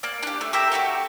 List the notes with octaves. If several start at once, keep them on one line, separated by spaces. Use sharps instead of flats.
A#3 D5
D4 G4
A3
G4 A#4 E5 G5
A3 A#3 F#4 G4